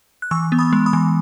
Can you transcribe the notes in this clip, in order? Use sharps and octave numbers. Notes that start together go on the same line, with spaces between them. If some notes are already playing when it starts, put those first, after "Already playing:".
F#6
E3 C#6 E6
B3
B5 D#6
G#3
B5 D#6
E3